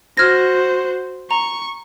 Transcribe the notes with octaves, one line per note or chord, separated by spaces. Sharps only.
F#4 C5 F6 G#6 A#6
A#5 C#6